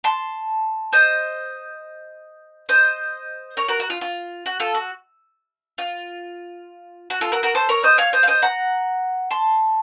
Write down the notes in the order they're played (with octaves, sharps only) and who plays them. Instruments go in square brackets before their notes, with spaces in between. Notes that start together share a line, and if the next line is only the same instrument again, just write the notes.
[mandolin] A5 C6
C5 D#5
C5 D#5
A#4 C#5
F#4 A#4
F#4
F4
F4
F#4
F4 A4
F#4
F4
F#4
F4 A4
F#4 A#4
F#4 A#4
A4 C5
A#4 C#5
C5 D#5
C#5 F5
C5 D#5
F5
C5 D#5
F#5 A#5
A5 C6